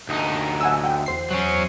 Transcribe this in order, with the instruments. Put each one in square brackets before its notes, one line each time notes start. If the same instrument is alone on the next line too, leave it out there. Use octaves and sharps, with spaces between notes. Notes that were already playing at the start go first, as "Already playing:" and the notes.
[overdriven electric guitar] D2 D#4
[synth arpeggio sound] F#5 G#5 E6
F#5 G5
E2 C5 C7
[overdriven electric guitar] F#3 C#4